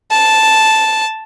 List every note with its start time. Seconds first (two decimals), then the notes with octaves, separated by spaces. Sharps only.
0.11 A5